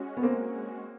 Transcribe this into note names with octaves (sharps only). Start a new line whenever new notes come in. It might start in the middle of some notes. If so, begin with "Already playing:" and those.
Already playing: G#3 C#4 F#4
B3
A#3 C4